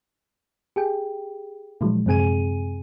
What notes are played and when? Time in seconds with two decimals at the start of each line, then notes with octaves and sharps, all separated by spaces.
0.76 G4 G#4 G5
1.81 A#2 D#3 F3 F#3 G#3
2.06 F#2 C3 C4 G#4 G#5 D#7